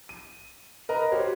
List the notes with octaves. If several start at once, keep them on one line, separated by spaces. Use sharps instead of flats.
D#7
A#4 B4 D#5 A#5
F#4 G4 C5 C#5